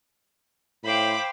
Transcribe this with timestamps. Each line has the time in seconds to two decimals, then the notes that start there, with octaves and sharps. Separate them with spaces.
0.84 A2 C5 F5 G5 B5 D6